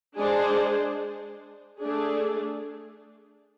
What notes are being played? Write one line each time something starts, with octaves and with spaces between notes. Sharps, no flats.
G#3 D4 G#4 C5
A3 D4 G#4